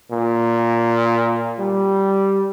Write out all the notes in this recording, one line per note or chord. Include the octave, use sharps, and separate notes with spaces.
A#2
G3